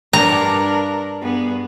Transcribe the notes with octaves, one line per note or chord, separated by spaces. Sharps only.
G2 D4 A#4 A#5
G2 B3 G#4